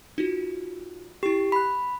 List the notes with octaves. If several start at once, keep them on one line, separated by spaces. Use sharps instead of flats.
D#4 F4 F#4
E4 G4 C#6
B5 F#6 B6